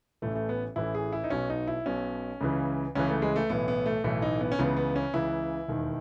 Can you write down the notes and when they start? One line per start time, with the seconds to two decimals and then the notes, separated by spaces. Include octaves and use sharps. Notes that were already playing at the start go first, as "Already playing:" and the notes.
0.22 A1 A2 E3 A3
0.35 A3
0.49 B3
0.76 A1 A2 E3 E4
0.95 G#4
1.13 E4
1.24 D#4
1.30 B1 B2 C#4
1.50 D#4
1.68 E4
1.86 B1 B2 C#4
2.41 C#2 C#3 E3
2.95 C#2 C#3 E3 C#4
3.08 A3
3.22 G#3
3.36 A3
3.49 B1 A2 E3 B3
3.68 B3
3.86 A3
4.04 B1 A2 E3 A3
4.22 D#4
4.41 B3
4.52 C#4
4.59 C#2 C#3 E3 B3
4.77 B3
4.96 C#4
5.14 C#2 C#3 E3 E4
5.68 E1 D#2 D#3